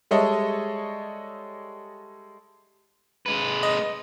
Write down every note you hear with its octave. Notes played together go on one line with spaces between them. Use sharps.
G3 G#3 A4 C#5 D#5 E5
G#3 B4
D#5